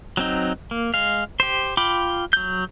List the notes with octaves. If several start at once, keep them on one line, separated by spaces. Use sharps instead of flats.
F#3 C4 D#4
A#3
G#3 F5
G4 C5
F4 G5 B5 D6
F#3 G6